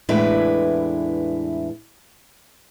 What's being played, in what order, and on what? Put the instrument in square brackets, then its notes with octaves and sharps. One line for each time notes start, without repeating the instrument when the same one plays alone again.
[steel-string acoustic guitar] E2 A2 G#3 D4 E4 B4